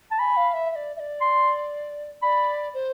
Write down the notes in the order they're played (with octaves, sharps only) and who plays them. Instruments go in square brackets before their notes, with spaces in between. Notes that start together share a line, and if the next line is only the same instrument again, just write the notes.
[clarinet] A5
[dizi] G#5 [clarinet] B5
[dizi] F5
E5
E5
D5
E5
D5
[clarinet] C6
[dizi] D5 [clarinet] B5
[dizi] C5